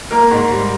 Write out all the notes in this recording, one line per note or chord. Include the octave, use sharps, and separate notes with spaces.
A#3 A#4
G#2
G3